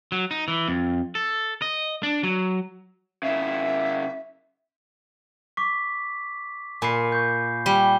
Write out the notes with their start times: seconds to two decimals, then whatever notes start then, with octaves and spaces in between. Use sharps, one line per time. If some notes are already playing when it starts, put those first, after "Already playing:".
0.12 F#3
0.31 D#4
0.48 E3
0.68 F2
1.15 A4
1.62 D#5
2.03 D4
2.23 F#3
3.23 C#3 E4 E5
5.57 C#6 D6 B6
6.82 A#2 G#5 B5 C7
7.12 C#6 G6
7.66 G3 G7